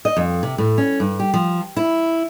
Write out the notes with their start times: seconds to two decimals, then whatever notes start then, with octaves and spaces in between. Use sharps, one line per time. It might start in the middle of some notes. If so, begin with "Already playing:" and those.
0.05 D#5
0.17 F2
0.43 C3
0.58 A2
0.78 C#4
1.00 G2
1.20 G4
1.34 F3
1.77 E4